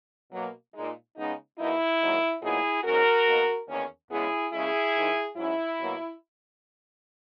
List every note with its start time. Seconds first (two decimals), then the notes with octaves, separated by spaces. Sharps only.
0.32 B2 F#3 A#3
0.74 A#2 G#3 D#4
1.17 C#3 G#3 B3 D#4
1.58 E2 B2 A#3 D#4 E4
2.01 G#2 D#3 F#3 A#3 D#4
2.42 A#2 F#3 B3 D#4 E4 G#4
2.84 G#2 F#3 C#4 F#4 A#4
3.27 B2 A#3 D#4
3.69 E2 D#3 A#3 C#4
4.10 E2 C#3 G#3 B3 E4 G#4
4.52 D#2 C#3 G#3 C#4 E4 G#4
4.94 G#2 D#3 G#3 D#4
5.36 G#2 F#3 C#4 E4
5.78 B2 F#3 A#3